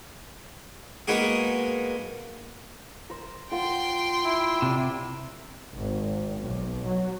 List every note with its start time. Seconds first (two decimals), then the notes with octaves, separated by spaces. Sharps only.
1.08 G#3 A#3 B3 D#4 F#4 G#4
3.10 A#4 C5
3.52 F4 A#4 F#5 G5 C6
4.24 E4
4.62 C3 D5 C6
5.74 G#1
6.41 B1
6.86 F#3